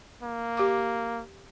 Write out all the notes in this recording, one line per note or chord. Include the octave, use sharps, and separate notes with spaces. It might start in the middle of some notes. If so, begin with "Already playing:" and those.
A#3
G4 D6